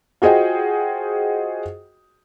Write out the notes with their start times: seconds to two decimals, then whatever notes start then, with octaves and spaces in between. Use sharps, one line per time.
0.22 F4 F#4 G#4 C5 D#5 G5